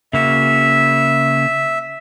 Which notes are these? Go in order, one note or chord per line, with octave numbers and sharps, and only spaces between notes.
C#3 A#3 F#4 E5